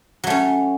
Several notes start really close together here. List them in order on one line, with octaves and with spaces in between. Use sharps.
F#3 A3 C#4